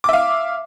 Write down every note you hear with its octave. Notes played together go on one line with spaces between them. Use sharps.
E5 F5 D6